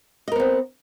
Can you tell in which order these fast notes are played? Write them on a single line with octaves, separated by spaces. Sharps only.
D#5 A#4 B3 C4